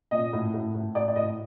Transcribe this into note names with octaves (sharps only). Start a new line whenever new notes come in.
A#2 D#5
A2
A2
A2
A2 D5
D5
A2 D#5